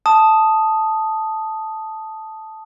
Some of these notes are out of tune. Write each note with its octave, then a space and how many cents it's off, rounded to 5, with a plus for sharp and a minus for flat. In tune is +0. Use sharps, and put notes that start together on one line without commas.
A5 -5 D#6 +0